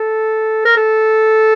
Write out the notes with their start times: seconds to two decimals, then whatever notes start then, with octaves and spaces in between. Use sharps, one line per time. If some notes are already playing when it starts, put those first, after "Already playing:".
Already playing: A4
0.65 A#4
0.76 A4